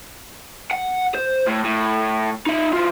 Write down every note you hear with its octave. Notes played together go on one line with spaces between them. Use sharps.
F#5
C5
A2
A2
D#4 E5
E3 F4